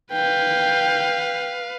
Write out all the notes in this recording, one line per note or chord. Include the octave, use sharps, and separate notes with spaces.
B4 F5 G5